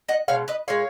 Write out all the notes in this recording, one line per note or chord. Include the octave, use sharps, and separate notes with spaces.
D#5 F#5
B2 G#3 C#5 F5
B4 D#5
A#2 G#3 C#5 F5